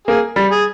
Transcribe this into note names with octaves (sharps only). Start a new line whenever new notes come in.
A#3 G#4
G3
G#4